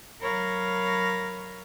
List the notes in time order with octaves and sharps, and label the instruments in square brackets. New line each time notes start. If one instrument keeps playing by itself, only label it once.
[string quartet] F#3 A#4 C#5 F5 B5 A#6